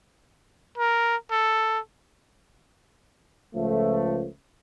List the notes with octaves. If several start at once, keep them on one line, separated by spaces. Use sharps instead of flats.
A#4
A4
C#2 F3 A3